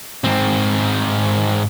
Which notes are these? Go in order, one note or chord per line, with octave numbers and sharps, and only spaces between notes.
G#2 C4